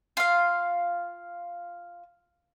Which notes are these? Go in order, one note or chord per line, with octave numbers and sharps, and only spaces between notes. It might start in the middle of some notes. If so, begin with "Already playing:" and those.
F4 F5